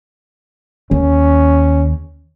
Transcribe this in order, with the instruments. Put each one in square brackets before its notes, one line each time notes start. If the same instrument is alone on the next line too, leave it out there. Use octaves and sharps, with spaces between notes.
[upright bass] D#2 [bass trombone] C#4